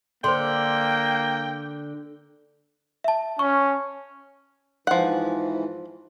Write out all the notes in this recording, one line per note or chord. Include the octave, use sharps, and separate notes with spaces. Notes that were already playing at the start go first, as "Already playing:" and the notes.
D3 A#3 C5 G5 C6
E5 A5
C#4 C#6
G#2 E3 F3 F#5